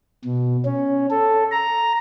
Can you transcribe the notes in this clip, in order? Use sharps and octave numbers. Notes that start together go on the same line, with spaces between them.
B2
C#4
A4
A#5